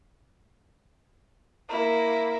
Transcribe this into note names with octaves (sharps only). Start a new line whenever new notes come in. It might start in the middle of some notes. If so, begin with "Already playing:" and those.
A#3 E4